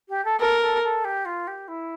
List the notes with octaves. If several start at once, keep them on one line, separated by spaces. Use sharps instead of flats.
G4
A4
A4 A#4
A4
A4
G4
F4
G4
E4